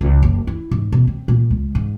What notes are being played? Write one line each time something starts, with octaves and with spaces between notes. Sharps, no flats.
C#2
F#1
E4
G#2
B2
C4
A#2
C#2
G#2